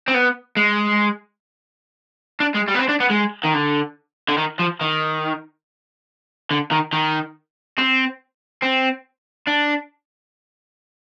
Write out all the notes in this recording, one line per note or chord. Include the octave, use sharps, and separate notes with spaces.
C4
B3
G#3
D4
G#3
G3
B3
C4
D4
B3
G#3
D#3
D3
D3
D#3
F3
D#3
D3
D#3
D#3
C4
C4
D4